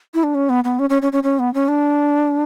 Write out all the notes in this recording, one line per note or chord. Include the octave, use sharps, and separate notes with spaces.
E4
D4
C#4
B3
B3
C#4
C#4
C#4
C#4
C#4
B3
C#4
D4